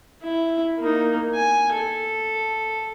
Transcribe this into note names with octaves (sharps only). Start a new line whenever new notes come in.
E4
A#3 D#4
G#5
A4